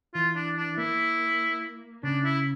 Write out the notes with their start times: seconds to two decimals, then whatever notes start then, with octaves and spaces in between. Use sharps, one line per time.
0.14 E3 F4
0.36 D4
0.57 D4
0.77 A#3 E4
2.03 C#3 D4
2.24 E4